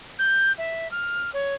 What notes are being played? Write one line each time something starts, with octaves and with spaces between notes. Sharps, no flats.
G6
E5
F6
C#5